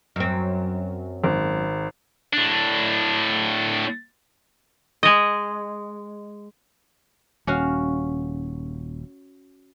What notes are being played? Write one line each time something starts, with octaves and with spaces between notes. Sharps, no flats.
F#2 C4
G#1
A2 D4
G#3 D#5
D#1 C#4 F#4 F5